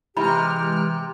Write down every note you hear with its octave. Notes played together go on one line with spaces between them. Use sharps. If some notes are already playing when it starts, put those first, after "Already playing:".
C3 E3 G#3 E4 G4 A#5 B5 F6